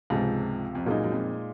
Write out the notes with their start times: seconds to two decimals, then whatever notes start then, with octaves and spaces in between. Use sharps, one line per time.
0.10 C#2 G#2 C3 F3
0.75 F2
0.86 F#2 A#2 G#3 D#4
1.04 F#2
1.12 F2